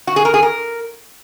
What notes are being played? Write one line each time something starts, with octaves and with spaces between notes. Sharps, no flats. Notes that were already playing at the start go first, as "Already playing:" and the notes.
F#4
G#4
A#4
G#4
A#4